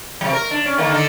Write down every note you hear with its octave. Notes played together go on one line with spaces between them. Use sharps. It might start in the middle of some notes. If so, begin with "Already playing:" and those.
C3 F#3
A#4
D4
C#4
D3 D#3 A#3
D3 D4 D#4